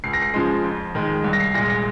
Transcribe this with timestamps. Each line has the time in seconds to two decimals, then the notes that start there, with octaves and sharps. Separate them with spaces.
0.04 C#2 C7
0.13 A#6
0.22 C7
0.34 C#3 F3 G#3
0.64 F2
0.95 D#3 G#3
1.24 C2
1.33 A#6
1.40 C7
1.54 A#2 G#3 A#6
1.70 A#6